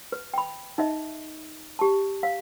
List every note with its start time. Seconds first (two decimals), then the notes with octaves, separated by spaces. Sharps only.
0.12 B4
0.34 G5 B5
0.78 D#4 D#5 E5
1.79 G4 A5
2.23 F5